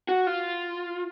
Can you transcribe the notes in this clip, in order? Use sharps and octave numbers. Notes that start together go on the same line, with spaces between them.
F#4
F4